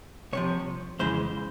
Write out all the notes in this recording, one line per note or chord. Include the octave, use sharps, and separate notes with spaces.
C2 C3 F3 C#5
F2 C#3 E3 G#3 C5